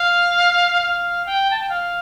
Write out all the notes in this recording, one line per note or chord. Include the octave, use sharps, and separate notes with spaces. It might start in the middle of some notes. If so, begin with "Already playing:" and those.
Already playing: F5
F5
G5
A5
G5
F5